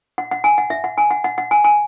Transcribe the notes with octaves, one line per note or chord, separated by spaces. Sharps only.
F#5
F#5
G#5
F#5
E5
F#5
G#5
F#5
F#5
F#5
G#5
G#5